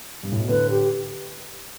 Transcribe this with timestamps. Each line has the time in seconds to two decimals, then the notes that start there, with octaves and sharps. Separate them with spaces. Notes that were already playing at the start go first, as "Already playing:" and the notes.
0.23 G2
0.32 A2
0.39 B2
0.48 A2 D3 B4
0.69 G4